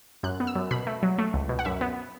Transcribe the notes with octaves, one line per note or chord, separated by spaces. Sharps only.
F#2 F#6
B3
E6
F#2
B2 B5
A3
F#3
A3
C#2
B2
F#5
F#2 E5
B3